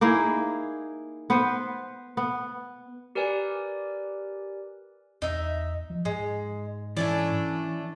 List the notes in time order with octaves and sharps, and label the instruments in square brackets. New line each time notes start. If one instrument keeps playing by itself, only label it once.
[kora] A#3 D#4 E4 G#4
B3 B4 C5
B3
[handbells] G4 A#4 B4 D5 G#5
[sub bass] E2 [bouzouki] D#4 E5
[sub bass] F3
[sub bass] G#2 [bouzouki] G#3
[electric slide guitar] E3 [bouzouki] A3 C#4 D4